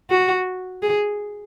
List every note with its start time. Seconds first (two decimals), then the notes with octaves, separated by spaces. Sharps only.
0.10 F#4
0.83 G#4